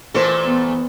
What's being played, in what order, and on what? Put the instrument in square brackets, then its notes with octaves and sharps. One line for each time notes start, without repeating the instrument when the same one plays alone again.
[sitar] A#2 A3 A4 [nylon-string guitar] E3 C5
[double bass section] B3